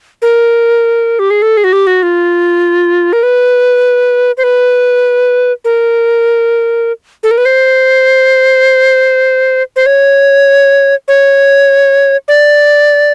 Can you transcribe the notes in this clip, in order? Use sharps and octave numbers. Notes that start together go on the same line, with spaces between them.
A#4
G4
G#4
A4
G#4
F#4
G4
F#4
F4
A#4
B4
C5
B4
A#4
A4
A#4
B4
C5
C5
C#5
C#5
D5